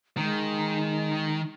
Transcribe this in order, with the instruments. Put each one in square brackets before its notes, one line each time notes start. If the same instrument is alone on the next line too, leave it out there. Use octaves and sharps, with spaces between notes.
[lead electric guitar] D#3 [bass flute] G#3